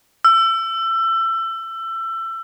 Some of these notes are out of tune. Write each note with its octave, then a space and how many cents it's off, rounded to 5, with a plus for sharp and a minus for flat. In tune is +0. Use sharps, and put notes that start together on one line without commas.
E6 +25